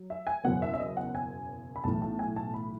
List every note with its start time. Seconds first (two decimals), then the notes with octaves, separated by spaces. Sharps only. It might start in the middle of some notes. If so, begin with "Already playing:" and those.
Already playing: F#3
0.10 E5
0.27 G#5
0.44 F#1 E2 B2 F#3 F#5
0.62 E5
0.74 E5
0.79 D#5
0.97 F#5
1.15 G#5
1.76 B5
1.84 B1 A2 E3 A5
2.02 A5
2.19 G#5
2.36 A5
2.54 B5